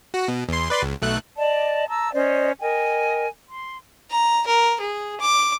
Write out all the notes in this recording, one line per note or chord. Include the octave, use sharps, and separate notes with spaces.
F#4
B2
E2 C6
B4 D5 C6
C#2
B1 A3 F#6
D5 D#5 A5
A5 A#5 E6
C#4 C5 D5 D#5
A#4 D#5 G5 G#5
C6
A#5
A#4
G#4
D6